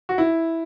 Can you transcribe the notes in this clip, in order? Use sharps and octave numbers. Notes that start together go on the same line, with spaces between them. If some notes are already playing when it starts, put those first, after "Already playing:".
F#4
E4